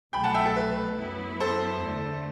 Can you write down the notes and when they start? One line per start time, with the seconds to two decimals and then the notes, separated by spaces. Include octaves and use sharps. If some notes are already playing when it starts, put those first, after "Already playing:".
0.13 C2 B2 F#3 A3 G5 B5
0.24 F#5 A5
0.34 E5 G5
0.45 A4
0.56 B4
0.97 F#2 F#3 B3 E4
1.40 A4 C5
1.82 E2 D3 A3